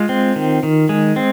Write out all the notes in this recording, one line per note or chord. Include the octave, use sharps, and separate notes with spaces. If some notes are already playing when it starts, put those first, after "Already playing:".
Already playing: G#3 F4
C4
D#3
D#3
G#3
C4